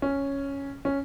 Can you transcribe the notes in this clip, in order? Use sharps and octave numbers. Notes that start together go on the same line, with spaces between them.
C#4
C#4